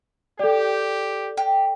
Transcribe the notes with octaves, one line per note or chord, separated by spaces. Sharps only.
G4 A4 D5
G4